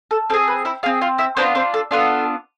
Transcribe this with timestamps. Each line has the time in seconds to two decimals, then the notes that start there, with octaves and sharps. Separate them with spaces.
0.11 A4
0.30 C4 A4
0.34 G#4
0.48 B4
0.65 E4 E5
0.83 C4 F4 G#4 F5
1.01 F4 F5
1.18 E4 E5
1.37 B3 C4 D4 F4 C5
1.55 C4 C5
1.74 A4
1.91 B3 D4 F4 A4